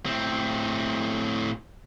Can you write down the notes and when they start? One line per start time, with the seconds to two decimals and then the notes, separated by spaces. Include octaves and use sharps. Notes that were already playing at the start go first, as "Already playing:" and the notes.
0.06 A2 C4